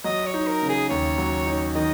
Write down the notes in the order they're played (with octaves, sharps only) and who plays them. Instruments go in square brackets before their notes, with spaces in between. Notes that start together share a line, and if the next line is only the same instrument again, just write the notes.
[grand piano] F#3 [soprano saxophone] D#5
[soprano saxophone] C#5
[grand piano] D#4
[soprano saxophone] A#4
[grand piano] C#3
[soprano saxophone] G#4
[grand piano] D#2 [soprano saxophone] C#5
[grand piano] F#3
D#4
[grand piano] D#3 [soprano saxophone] D#5